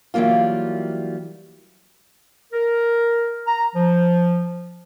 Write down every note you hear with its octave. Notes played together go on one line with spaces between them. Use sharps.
E3 F#3 G3 A#3 F4
A#4
A#5
F3